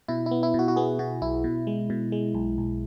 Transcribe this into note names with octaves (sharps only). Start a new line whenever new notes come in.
B2 E4
E4
B3
E4
B2 F#4
F#4
B3 G#4
B2 F#4
B1 E4
B2
G#3
B2
G#3
B1
B1